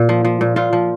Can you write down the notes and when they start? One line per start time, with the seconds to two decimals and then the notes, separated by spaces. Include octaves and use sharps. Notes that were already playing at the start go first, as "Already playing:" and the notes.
Already playing: A#2
0.09 F3
0.25 F3
0.41 A#2
0.56 A#2 F4
0.73 F3